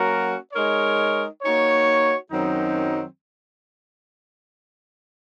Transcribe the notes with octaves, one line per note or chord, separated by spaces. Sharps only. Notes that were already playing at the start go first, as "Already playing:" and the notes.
Already playing: F#3 A#3 C#4 F#4 A#4
G#3 D#4 A#4 C#5
A#3 D#4 F#4 C#5
F#2 D#3 F#3 C4 D#4